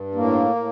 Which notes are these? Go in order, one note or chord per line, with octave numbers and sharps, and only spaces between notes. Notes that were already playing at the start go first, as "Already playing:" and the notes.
Already playing: G2
A2 A#3
A2